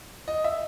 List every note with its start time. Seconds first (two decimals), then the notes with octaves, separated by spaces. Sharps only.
0.28 D#5
0.44 E5